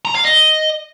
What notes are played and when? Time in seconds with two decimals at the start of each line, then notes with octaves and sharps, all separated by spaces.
0.05 A#5
0.15 F5
0.25 D#5